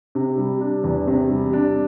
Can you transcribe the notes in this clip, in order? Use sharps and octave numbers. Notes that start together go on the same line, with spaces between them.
C3
G3
D4
E2
C3
G3
D4